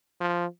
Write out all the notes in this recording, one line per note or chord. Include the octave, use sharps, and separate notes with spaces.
F3